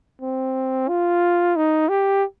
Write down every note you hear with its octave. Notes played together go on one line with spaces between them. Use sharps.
C4
F4
D#4
G4